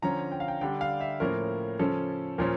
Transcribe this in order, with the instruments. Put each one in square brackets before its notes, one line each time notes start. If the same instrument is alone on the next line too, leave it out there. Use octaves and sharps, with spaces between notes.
[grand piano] D3 F3 C#4 A#5
G5
F5
G5
D3 G3 D4 G5
F5
E5
A2 F3 A#3 C#4 A#4
C#3 F3 C#4 A4
A#2 F3 C#4 A#4